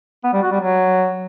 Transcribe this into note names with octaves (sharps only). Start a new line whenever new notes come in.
B3
G3
F#4
G3
F#3